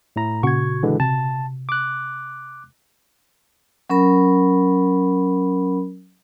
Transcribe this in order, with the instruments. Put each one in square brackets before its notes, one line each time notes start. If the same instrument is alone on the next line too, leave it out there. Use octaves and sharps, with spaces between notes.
[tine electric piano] A2 E4 A#5
[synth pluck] A#2 C#3 F#4 [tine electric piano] C#6 G#6
[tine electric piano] D3 E3 G#3
[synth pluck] C3 [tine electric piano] A5
[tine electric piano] D6 F#6
[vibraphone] F#3 C#4 A#4 B5